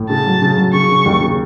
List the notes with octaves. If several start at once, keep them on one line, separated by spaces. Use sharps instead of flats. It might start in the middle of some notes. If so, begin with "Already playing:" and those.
Already playing: A2
C#3 A5
F#3
C#3
F#3
C#3 C#6
C#3
D#2
C#3